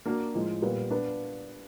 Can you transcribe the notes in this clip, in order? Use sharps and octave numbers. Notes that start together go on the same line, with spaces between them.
A#3 D4 F#4 A#4
A2 F3 G#3
A#2 G3 B3
B3 D4